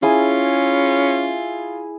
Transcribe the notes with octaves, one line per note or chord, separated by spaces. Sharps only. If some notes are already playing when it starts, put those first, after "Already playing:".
C#4 E4 F4 G#4